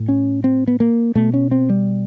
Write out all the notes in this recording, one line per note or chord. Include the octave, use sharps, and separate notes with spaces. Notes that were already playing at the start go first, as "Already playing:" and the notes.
Already playing: A2
C#4
C4
B3
A#3
B2 A3
C#4
C4
G3